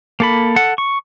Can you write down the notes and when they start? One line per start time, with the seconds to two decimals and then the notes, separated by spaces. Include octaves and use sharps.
0.20 A#3 A4 B5
0.56 A4 F#5
0.78 C#6